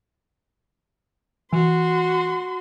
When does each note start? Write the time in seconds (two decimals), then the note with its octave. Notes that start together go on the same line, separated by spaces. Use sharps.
1.52 E3 F#4 C6